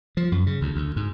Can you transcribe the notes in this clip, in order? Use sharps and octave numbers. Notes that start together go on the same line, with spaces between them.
F3
F#2
C#3
D2
D2
G#2